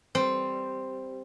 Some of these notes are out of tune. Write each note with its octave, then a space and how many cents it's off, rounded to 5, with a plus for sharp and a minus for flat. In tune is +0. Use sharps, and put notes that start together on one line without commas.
G3 +0 C4 +0